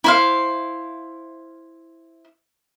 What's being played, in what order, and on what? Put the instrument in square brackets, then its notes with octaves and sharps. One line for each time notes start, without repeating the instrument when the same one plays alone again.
[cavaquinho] E4 C5 F5